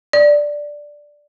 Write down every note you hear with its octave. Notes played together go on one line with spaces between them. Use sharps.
D5